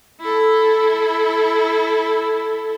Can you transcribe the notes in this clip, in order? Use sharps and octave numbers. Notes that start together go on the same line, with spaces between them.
E4 A4